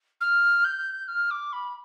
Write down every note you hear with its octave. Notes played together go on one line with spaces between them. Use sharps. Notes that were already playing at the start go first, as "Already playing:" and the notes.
F6
G6
F6
D6
B5